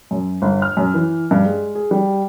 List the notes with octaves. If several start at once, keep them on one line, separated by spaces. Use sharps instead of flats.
F#2
G1
F6
F#2
E3
G2
G#3
G#4
G3